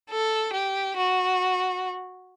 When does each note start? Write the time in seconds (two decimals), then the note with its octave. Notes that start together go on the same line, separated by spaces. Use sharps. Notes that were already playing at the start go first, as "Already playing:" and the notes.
0.10 A4
0.53 G4
0.97 F#4